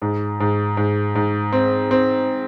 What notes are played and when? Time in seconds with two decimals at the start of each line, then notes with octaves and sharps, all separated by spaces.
0.02 G#2
0.40 G#2
0.77 G#2
1.15 G#2
1.52 C4
1.91 C4